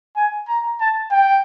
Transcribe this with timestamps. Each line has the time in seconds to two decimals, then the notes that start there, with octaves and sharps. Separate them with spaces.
0.16 G#5
0.48 A#5
0.81 A5
1.11 G5